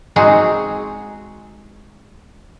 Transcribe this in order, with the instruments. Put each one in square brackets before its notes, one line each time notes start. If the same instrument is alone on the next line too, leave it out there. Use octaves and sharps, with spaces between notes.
[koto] G#3 C4 D#4 F#4 G#4